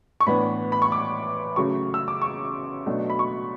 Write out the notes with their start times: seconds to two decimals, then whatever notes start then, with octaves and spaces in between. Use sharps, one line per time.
0.20 C#6
0.27 A2 E3 B3 D4 B5
0.72 B5
0.82 C#6
0.92 D6
1.56 C#3 F#3 A3 C#6
1.94 E6
2.08 D6
2.22 C#6
2.86 B2 F#3 A3 D4
3.10 B5
3.19 C#6